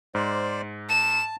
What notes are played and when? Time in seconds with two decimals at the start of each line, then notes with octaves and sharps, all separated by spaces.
0.15 G#2 C5 D5
0.89 A5 E7